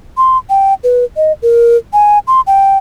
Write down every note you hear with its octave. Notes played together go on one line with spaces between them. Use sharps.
C6
G5
B4
D#5
A#4
G#5
C6
G5